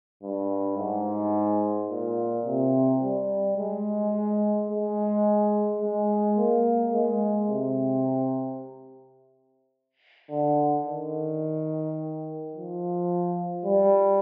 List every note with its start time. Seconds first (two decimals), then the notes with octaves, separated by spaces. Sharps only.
0.23 G2
0.77 G#2
1.89 A#2
2.45 C3
3.02 G3
3.57 G#3
4.70 G#3
5.81 G#3
6.37 A#3
6.93 G#3
7.49 C3
10.30 D3
10.85 D#3
12.53 F3
13.65 G3